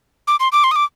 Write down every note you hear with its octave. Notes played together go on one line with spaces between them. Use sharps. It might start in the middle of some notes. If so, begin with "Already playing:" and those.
D6
C6
D6
C6
D#6
D6